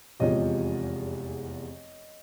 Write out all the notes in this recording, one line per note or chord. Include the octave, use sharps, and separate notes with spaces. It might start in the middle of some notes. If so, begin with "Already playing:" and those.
F1 E2 C3 F3 G#3 C#5 D#5